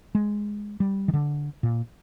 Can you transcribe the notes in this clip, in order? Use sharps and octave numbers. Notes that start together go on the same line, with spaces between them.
G#3
G3
D#3
D3
A#2